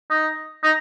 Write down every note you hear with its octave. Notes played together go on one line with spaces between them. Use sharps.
D#4
D#4